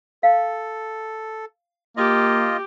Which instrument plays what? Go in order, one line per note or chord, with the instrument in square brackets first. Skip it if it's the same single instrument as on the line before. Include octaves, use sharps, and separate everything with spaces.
[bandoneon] A4 [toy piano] F5
[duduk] A#3 [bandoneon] F4 D#5 [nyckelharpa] G4